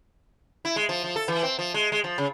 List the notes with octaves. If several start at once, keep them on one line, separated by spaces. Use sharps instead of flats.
E4
G#3
F3
F3
A4
E3
C4
F3
G#3
G#3
F3
C#3